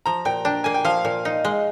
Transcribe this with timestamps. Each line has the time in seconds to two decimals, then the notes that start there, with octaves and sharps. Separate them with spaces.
0.06 F3 A#5
0.25 A#2 G5
0.45 D4 G5
0.64 A#3 G#5
0.74 G5
0.85 F3 F5
1.05 A#2
1.25 D#4
1.45 G#3